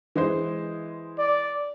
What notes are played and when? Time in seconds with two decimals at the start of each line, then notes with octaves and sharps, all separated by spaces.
0.16 E3 G#3 C5
1.18 D5